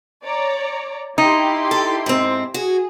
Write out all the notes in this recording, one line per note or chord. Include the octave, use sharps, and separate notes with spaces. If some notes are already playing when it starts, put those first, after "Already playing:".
C#5 D5 A#5
D#4 E4 G4 C6
A4
G#2 C4
F#4 G#4